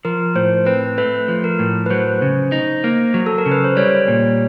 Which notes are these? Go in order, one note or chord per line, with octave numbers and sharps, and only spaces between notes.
F3 A#4
A2 C5
C4 B4
A3 B4
F3
A#4
A2
B4
F#3 C5
C#3
D#4
A#3
F#3
A4
A#4
C#3
B4
C5
G3 C#5
A#2